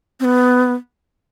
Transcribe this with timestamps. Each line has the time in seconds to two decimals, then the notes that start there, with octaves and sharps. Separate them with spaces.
0.20 C4
0.25 B3